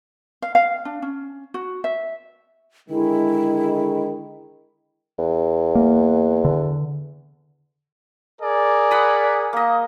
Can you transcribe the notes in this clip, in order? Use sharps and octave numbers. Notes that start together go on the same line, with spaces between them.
F5
F5
D4
C#4
F#4
E5
D3 D#3 G#3 E4
E2
A#3
D3
G#4 A#4 D5
F#5 B5 D#6
A#3 D#5